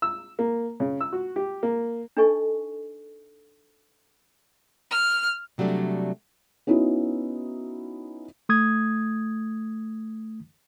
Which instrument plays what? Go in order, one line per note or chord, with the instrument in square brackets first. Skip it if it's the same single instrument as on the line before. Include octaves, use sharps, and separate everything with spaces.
[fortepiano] E6
A#3
C#3
E6
F#4
G4
A#3
[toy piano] D4 D#4 A4 D#5 G#5 C#6
[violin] F6
[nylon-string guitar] C3 F#3 G3 A3 D4
[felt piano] B3 C#4 D#4 E4 F#4
[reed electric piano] A3 D#6 G#6